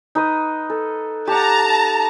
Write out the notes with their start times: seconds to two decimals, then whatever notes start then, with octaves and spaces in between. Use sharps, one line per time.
0.15 D#4 B4 D#6
0.70 A4
1.27 G4 F#5 A5 A#5